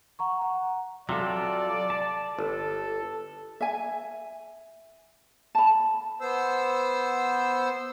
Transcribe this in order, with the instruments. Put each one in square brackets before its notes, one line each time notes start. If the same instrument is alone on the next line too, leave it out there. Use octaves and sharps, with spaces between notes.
[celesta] F#5 A#5 C#6
F#5
[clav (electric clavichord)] C3 [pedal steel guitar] F#3 F4 A4 [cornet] D5
[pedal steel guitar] A5
[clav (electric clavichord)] G1 [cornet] A4
[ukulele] E5 G#5
A5 B5
[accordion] B3 C5 E6